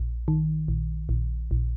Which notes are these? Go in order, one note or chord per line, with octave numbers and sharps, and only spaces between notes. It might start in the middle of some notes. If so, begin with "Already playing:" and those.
Already playing: A#1
D#3
A#1
A#1
A#1